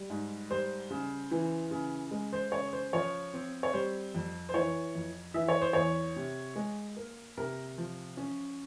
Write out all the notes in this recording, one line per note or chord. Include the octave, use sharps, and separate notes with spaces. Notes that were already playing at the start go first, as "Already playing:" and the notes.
Already playing: G3
G#2
G3 C5
C#3
E3
C#3
G#3
C5
C#3 C#5
C5
F3 C#5
C4
C#5
G3 C5
F2
C5
E3 C#5
F2
E3 E5
C#5
C5
E2 C#5
C3
G#3
A#3
C3 A#4
F3
C#4